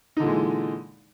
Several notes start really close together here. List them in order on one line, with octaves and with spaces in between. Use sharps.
D#4 D3 A#2 G#3 E3